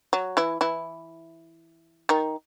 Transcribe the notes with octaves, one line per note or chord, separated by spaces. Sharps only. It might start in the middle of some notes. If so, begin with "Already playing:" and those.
F#3
E3 E4
E3 E4
D#3 D#4